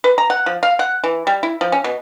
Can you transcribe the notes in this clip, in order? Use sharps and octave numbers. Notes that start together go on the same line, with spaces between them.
B4
A#5
F#5
F3
F5
F#5
E3
G3
E4
F3
C#4
B2